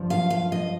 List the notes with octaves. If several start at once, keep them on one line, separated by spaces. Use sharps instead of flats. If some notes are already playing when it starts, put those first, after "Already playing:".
Already playing: G2 F3
F5
F5
D#5